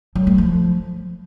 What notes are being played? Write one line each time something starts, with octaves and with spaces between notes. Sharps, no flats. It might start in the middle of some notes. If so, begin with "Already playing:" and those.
F#3
A3
F3